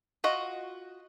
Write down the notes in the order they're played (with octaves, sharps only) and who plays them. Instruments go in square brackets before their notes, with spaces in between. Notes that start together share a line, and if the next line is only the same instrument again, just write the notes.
[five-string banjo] F4 F#4 D#5